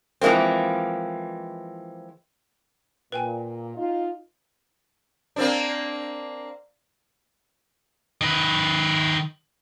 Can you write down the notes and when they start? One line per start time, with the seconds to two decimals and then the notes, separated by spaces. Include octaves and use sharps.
0.21 E3 F3 G#3 A#3 C4
3.12 A#2 B4 G5 G#5
3.77 D#4 F4
5.36 A#3 C4 D4
8.21 D#3 B4